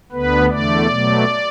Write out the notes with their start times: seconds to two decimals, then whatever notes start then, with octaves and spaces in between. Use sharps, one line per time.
0.12 D2 D3 B3 B4
0.49 E2 D3 A3 D5
0.87 B2 F#3 A3